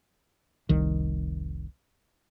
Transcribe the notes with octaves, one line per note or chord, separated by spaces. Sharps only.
F1 C2 D#3